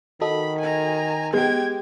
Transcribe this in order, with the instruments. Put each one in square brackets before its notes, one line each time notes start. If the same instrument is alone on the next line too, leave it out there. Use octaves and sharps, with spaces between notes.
[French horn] D#3 [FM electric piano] F#4 A4 D#5 [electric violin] B5
[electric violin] G#5 A#5
[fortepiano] G#3 G4 [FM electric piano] B3 [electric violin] G5 G#6